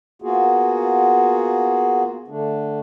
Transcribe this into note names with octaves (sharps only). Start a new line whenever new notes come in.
A#3 B3 F4 F#4 G#4
D3 A3 D4